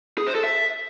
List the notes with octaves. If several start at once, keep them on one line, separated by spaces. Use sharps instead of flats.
G#4
C5
A4
E5